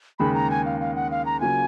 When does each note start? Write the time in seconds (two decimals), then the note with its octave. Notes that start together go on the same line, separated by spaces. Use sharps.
0.19 D#2 C#3 G#3 B5
0.34 A#5
0.50 G#5
0.65 F5
0.80 F5
0.96 F#5
1.11 F5
1.26 A#5
1.40 C#3 F#3 A#3 F4 G#5